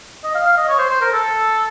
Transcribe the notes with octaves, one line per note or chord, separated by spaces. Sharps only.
D#5
F5
F5
D#5
C#5
C5
C5
A#4
A4